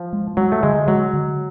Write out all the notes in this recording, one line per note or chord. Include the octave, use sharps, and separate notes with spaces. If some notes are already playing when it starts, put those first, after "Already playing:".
Already playing: F3
G#3
F#3 G#3
A3
D3 G#3
F#3 G#3
D3